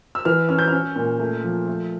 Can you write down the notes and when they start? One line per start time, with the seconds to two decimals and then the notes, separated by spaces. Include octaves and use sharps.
0.15 E6
0.25 E3 F6
0.49 C#4 F6
0.59 G6
0.68 C#4 F6
0.96 A#2
1.20 A3
1.44 F3
1.67 A3